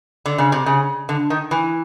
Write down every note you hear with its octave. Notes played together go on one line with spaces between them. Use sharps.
D3
C#3
C3
C#3
D3
D#3
E3